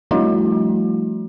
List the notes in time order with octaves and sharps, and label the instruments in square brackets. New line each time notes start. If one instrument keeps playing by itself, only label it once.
[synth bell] F3 G3 A3 D4 E4 F#4